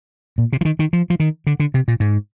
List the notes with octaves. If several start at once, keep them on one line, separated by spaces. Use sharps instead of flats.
A#2
C3
F3
D#3
D#3
F3
F3
D#3
D3
D3
C3
A#2
G#2